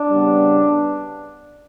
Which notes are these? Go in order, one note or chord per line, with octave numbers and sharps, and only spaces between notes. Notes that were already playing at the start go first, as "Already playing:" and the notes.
Already playing: D4
C#3 G3 B3